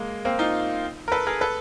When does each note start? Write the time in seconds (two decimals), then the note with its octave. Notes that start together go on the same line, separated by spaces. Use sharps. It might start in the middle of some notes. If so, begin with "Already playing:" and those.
Already playing: G#3 A#3
0.25 A#3 C4
0.39 D#4 F4
1.08 A#4
1.12 A4 B4
1.27 G#4 A#4
1.41 A4 B4